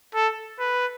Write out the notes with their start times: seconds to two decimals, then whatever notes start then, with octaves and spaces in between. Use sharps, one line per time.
0.15 A4
0.59 B4